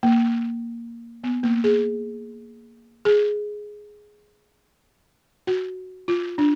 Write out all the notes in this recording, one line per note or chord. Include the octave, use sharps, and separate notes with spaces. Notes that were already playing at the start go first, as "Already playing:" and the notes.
A#3
B3
A#3
G#4
G#4
F#4
F4
D4